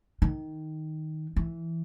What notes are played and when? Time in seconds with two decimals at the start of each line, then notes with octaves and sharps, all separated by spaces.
0.22 D#3
1.36 E3